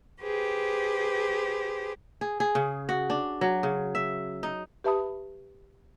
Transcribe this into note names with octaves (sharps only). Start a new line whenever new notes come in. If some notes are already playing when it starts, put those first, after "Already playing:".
G4 G#4 B4 C5
G#4
G#4
C#3
F#4
D4
F#3
C#3
E5
D#4
G4 B4 E5 A5 B5 D#6